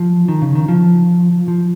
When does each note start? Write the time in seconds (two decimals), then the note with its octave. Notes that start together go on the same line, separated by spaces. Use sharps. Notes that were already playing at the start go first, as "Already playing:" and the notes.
Already playing: F3
0.28 D#3
0.42 C#3
0.55 D#3
0.68 F3
1.48 F3